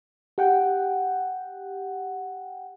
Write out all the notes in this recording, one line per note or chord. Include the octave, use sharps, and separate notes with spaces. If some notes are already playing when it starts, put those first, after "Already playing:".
G4 F#5 G5